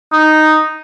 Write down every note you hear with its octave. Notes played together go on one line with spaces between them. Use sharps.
D#4